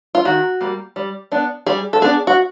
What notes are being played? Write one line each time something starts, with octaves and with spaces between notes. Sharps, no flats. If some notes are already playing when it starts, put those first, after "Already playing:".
F4
D#3 F#4
G3 A#3
G3
B3 D4
G3 G#4
A4
B3 D4 G#4
F#4